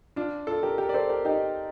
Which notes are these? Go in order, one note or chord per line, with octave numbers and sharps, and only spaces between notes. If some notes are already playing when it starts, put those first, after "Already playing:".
D4 F4
F4 A4
G4 A#4
G4 A#4
D5
A4 C5
G4 A#4
D#4 G4